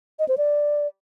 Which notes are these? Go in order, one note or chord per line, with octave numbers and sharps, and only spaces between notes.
D#5
C5
D5